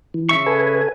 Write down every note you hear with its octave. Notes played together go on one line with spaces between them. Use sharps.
E3
C#3 E5 C#6
A4 B4 G#5